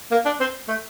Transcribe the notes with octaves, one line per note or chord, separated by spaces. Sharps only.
A#3
D4
C4
A3